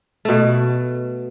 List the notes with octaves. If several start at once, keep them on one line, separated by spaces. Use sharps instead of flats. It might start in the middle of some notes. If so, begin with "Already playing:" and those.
B2 A3